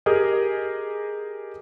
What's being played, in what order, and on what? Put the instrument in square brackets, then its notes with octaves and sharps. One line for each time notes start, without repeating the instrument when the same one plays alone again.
[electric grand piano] G4 G#4 A#4 D#5